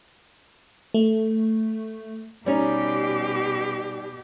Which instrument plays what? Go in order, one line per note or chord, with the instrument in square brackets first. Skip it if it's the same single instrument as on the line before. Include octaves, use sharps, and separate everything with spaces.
[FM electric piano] A3
[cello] B2 G4 [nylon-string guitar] G3 C#4 D#4